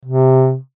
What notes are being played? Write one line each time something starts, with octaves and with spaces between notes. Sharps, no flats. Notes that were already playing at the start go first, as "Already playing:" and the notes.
C3